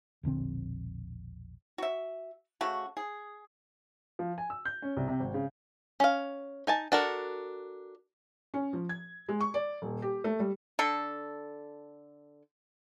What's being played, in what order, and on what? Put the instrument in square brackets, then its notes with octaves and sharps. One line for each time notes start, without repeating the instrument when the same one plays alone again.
[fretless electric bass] E1 A#1 D3 C4
[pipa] F#4 E5
C#3 A3 F#4
G#4
[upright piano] F3
G#5
E6
G6
C#4
C2
C3
G#1
C#3
[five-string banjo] C#4 F5
D#4 G#5 A5
D4 F#4 A4 A#4
[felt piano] C#4
F3
G#6
G#3
C#6
D5
D#1
G4
A3
G3
[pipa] D3 A4